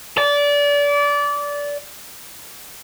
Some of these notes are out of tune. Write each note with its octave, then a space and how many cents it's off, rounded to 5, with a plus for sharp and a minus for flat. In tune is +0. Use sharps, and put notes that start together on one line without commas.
D5 -25